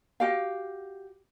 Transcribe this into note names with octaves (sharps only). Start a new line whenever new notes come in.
F#4 G4 F5